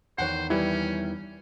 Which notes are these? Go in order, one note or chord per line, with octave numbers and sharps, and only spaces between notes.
E2 D#3 C5 C#5 F#5
E3 G3 C#4 E4